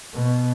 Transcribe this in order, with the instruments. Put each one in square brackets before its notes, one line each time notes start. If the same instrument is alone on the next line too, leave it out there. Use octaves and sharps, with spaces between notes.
[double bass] B2